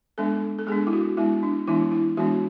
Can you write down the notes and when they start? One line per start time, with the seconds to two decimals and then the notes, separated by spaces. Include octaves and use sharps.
0.18 G#3 B3 D4 A4
0.59 A4
0.67 G#3 B3 D4 G#4
0.87 E4
0.93 F#4
1.17 G#3 B3 D4 E4
1.43 D4
1.67 E3 G#3 B3 D4 E4
1.92 E4
2.17 E3 G#3 B3 D4 F#4